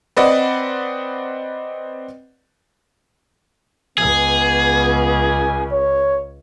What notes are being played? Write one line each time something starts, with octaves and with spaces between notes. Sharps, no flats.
C4 B4 D5 D#5 F#5
C#2 B3 G#4
C#5